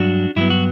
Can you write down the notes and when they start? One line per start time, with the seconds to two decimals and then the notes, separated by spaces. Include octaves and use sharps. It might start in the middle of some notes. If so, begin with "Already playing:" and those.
Already playing: G2 F#3 D4 F#4
0.36 G2 F#3 B3 E4
0.50 F#4